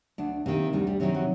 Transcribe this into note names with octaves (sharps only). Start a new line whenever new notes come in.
D2 D4
C3 D#3 A#3
D2 G3
G3
C3 D#3 F#3
F#3